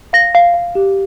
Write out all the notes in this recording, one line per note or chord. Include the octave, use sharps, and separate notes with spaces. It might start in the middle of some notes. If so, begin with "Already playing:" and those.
F5 A#6
F5
F5
G4